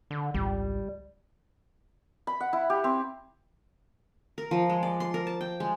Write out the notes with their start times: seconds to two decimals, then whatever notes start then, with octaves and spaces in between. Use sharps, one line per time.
0.11 D3
0.34 G#1 C#2 G3
2.27 B5
2.40 F#5
2.53 E4
2.70 G4
2.84 C4
4.38 A#4
4.51 F3
4.70 G#3
4.83 D5
5.00 C6
5.14 A#4
5.27 A5
5.41 G5
5.60 G#3